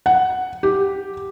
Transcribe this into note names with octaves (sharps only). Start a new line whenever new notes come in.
F#5
G4